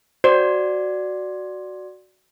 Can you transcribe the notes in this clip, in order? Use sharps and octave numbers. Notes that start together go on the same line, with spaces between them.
F#4 C5 D5